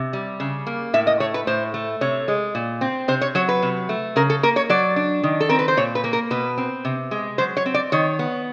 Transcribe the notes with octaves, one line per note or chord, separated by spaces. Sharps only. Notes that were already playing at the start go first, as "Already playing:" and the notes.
Already playing: C3
G3
C#3
A#3
A2 E5
D#5
A3 C#5
B4
A2 C5
A3
C3 C#5
G#3
A#2
C4
C3 C5
C#5
F#3 C#5
B4
C3
A3
C#3 A#4
A4
A#3 A#4
C#5
F#3 D5
D4
D#3
A4
C4 A#4
B4
C5
A#2 C#5
B4
A#3
A#4
B2 B4
C4
C3
G#3
F#3 C5
C#5
C4
D5
D#3 C#5
B3